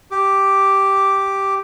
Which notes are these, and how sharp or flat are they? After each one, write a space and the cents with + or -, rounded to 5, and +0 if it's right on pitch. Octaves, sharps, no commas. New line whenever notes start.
G4 +0 D6 +0